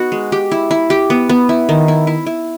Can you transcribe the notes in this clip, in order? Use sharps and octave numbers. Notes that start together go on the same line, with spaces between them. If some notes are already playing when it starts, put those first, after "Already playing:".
Already playing: B3 D#4 F#4
G#3
G4
E4
E4
G4
B3
B3
E4
D#3
E4
E4
E4